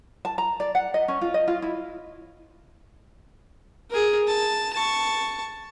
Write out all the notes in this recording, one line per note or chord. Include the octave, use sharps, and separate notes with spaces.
A5
A#5
D5
F#5
D#5
C#4
F4
D#5
F4
E4
G#4 A#4
A5
A5 C#6